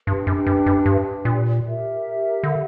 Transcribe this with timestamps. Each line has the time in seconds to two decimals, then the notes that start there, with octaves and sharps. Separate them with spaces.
0.07 G2 D4 G4 B4
0.27 F#2
0.47 F#2
0.66 F#2
0.86 G2
1.25 A#2
1.65 G4 A#4 E5
2.43 D3